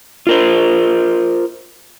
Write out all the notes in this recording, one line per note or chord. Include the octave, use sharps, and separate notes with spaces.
F4 A#4 C5